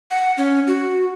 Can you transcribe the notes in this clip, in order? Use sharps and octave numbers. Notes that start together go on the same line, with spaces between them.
F#5
C#4
F#4